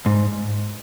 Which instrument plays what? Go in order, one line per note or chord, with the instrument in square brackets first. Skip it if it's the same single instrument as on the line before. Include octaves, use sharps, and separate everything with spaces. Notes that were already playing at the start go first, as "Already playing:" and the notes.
[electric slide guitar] G#2